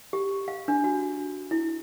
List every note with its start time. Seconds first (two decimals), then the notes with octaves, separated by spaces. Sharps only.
0.13 G4
0.48 F5
0.68 D4
0.84 F#4
1.51 E4